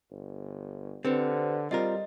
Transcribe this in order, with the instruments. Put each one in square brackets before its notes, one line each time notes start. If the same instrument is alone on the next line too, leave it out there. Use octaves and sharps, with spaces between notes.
[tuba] G1
[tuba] D3 [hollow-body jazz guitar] C4 [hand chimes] G4 B4 C5
[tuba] G3 [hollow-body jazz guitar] C4 F4 A#4 [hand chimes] D#5